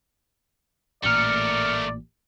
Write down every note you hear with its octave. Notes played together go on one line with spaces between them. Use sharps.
A1 A#2 A3 A#4 D5 F6 C#7